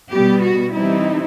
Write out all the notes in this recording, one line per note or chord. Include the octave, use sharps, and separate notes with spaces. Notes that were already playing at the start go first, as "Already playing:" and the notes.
B2 G3 B3 G4
F#4
E3 G3 C4 D#4 E4